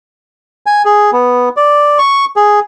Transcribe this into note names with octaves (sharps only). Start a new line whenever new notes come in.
G#5
G#4
B3
D5
C#6
G#4